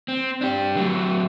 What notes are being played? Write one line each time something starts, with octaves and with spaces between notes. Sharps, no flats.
C4
D4 G4
F#3 A3